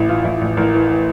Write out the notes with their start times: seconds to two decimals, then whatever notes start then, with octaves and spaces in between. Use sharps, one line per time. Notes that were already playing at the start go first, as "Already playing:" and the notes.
Already playing: A1 E4
0.08 E3 F4
0.24 A1 E4
0.41 A1
0.57 A1 A#4
0.74 E3
0.90 E3